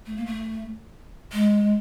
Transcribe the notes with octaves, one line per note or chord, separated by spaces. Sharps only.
A3
A#3
A3
G#3